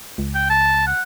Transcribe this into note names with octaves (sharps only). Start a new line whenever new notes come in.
C#2
G5
A5
F#5